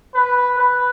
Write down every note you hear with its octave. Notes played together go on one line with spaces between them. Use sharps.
B4
B4